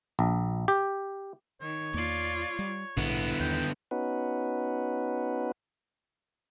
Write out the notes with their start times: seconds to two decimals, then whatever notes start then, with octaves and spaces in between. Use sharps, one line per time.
0.19 A#1
0.68 G4
1.62 D#3 C#5
1.94 E2 A#3 F4 D5
2.59 G3
2.97 A#1 G#2 B2 D3 B3 E4
3.40 D#2 G5
3.91 B3 C#4 D#4 F#4 B4